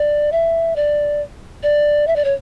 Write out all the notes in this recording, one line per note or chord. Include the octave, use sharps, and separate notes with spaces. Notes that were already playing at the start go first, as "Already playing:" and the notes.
Already playing: D5
E5
D5
D5
E5
D5
C#5